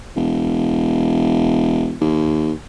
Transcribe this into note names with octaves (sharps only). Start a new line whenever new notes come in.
E1
D#2